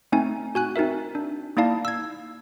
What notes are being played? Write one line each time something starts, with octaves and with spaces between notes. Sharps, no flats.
A3 C4 D#4 G#5
F#4 G#5 F#6
C4 D#4 F#4 A#4 E5
D4
A#3 D#4 E4 D5 F5 A5
E6 G#6